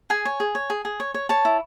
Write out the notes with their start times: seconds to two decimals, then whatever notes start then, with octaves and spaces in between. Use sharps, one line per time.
0.10 G#4 G#5
0.25 C#5
0.40 G#4
0.55 C#5
0.70 G#4
0.85 G#4
1.00 C#5
1.14 C#5
1.29 C#5 A5
1.45 E4